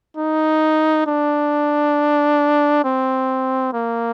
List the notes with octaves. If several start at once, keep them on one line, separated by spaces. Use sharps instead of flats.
D#4
D4
C4
A#3